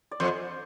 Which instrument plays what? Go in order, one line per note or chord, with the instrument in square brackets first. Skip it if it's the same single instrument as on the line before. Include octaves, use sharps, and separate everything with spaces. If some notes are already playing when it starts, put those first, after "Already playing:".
[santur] D5
[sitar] F2 [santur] C5